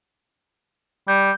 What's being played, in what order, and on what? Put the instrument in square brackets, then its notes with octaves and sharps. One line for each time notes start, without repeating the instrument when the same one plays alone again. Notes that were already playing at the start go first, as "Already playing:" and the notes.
[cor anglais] G3 [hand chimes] G6